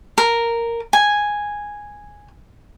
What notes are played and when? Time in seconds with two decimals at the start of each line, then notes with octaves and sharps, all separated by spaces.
0.18 A#4
0.93 G#5